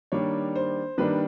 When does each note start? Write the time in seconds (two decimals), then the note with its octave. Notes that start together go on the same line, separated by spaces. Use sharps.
0.12 D#3 G3 A#3 D4 C#5
0.56 C5
0.98 D#3 G3 A#3 D4 B4